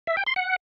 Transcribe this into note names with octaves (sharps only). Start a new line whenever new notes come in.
E5
G5
C6
F#5